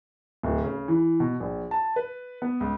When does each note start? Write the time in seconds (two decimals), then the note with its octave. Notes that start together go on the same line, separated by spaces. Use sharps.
0.43 D1
0.64 C#3
0.88 E3
1.20 B2
1.40 A#1
1.71 A5
1.96 B4
2.42 B3
2.60 C#2